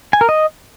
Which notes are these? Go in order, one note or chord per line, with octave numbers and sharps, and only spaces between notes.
G#5
A#4
D#5